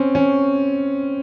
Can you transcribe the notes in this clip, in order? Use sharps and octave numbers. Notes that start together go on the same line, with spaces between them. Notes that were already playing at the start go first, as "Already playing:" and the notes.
Already playing: C4 C#4
C#4